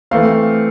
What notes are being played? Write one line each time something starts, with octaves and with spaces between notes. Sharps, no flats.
E3 A3 C4 F5